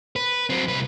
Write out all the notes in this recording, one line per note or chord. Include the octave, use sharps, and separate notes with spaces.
B4
F#3 C4
C2 B4